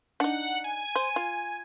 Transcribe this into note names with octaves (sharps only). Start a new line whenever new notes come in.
D4 D#4 F#5
G#5
C5
F4